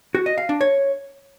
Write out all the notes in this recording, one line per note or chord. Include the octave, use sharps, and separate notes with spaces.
F#4
D#5
F5
D4
C#5